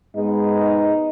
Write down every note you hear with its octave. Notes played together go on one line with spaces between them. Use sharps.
G#2 G#3 B3 D#4